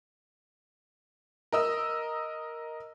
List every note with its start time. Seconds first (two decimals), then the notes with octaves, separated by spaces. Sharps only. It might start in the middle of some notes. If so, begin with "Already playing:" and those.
1.52 A#4 D#5 E6